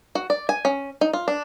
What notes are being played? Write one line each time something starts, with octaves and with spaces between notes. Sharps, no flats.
F#4
D5
G#5
C#4
D#4
F4
D4